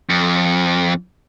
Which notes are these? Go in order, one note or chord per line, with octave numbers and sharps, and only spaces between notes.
F2